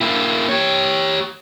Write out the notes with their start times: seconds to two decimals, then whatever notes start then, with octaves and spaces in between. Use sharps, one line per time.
0.01 A#3 E4
0.49 G4 C#5